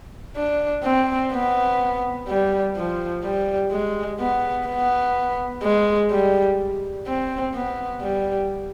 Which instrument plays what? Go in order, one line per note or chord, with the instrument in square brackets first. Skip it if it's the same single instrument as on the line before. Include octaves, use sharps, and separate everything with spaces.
[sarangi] D4
C4
B3
G3
F3
G3
G#3
B3
B3
G#3
G3
C4
B3
G3